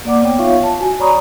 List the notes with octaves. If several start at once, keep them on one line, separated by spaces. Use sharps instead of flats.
A#3 D5 F#5 D6
B3 C#5 G5
D#4 F4 C#5 E5 F5 C#6
A5
F#4 G#5
C#5 D5 A#5 B5 C#6 D#6